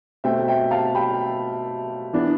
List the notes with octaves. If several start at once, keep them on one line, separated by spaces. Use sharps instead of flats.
B2 A3 C4 E5 G5
E5 G5
F5 A5
G5 B5
E3 B3 D4